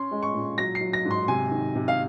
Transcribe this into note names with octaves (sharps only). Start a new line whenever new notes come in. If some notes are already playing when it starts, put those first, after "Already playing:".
Already playing: C#4 C6
G#3
C#6
A#2
F#3 A#6
C7
F#3
A#6
G#2
C6
C3 G#5
D#3
C3
F5